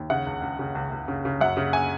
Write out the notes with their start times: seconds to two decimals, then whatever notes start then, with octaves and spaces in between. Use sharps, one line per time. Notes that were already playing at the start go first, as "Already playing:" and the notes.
Already playing: D#2
0.10 C#3 F#5
0.27 C#2
0.42 C#2
0.59 C#3
0.75 C#2
0.91 C#2
1.08 C#3
1.25 C#3
1.41 F#2 F#5
1.57 C#3
1.73 G#5